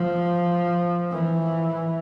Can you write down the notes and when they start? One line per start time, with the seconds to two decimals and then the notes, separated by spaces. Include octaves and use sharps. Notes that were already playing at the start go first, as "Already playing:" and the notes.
Already playing: F3
1.11 E3